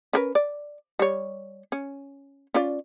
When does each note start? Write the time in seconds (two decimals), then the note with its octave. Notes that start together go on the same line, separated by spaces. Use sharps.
0.13 C#4 A#4 B4
0.35 D5
0.99 G3 C#5
1.72 C#4
2.54 C#4 F4 D5